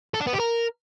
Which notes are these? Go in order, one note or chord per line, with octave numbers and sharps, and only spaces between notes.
A4
D4
B3
G4
A#4